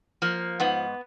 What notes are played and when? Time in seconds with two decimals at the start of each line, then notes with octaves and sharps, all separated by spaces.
0.22 F3 A#3
0.60 G#2 B3